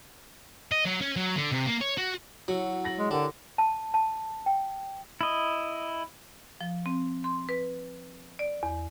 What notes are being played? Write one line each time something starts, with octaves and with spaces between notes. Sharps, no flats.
D#5
F#3
C#4
F#3
D3
C3
A#3
C#5
F#4
F#3 E4 F#4 C#5 F#5
A6 A#6 F#7
G#3
D3 D4 G4 A#4
A5
A5
G5
E4 D#5
F3
C4
C6
B4
D5
E2